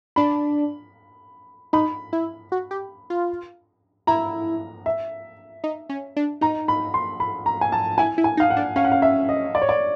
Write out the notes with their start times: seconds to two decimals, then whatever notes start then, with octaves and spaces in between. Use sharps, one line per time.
0.16 D4 B5
1.73 D#4 B5
2.13 E4
2.52 F#4
2.71 G4
3.10 F4
4.07 E4 A#5
4.86 E5
5.64 D#4
5.89 C#4
6.17 D4
6.41 D#4 A#5
6.68 B5
6.94 C6
7.20 B5
7.46 A#5
7.61 G#5
7.72 A5
7.98 E4 G#5
8.18 E4
8.24 G#5
8.37 D#4
8.40 F5
8.50 F#5
8.57 D4
8.76 C#4 F5
8.84 F#5
8.92 F5
9.02 E5
9.29 D#5
9.55 D5
9.62 C#5
9.69 D5